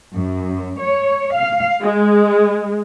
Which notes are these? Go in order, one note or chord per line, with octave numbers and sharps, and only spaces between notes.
F#2
C#5
F5
G#3